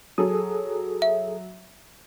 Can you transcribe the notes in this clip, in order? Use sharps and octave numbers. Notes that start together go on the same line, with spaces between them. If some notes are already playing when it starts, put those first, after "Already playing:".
F#3 G#4 A4 D#6
E5